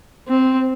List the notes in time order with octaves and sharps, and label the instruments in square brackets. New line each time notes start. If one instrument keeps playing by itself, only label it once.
[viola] C4